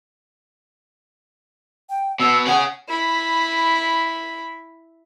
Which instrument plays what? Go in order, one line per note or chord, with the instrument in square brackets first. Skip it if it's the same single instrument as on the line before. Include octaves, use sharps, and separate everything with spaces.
[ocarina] G5
[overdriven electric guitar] B2 [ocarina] E6
[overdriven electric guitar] C#4 G#4 [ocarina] F#5
[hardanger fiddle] E4 B5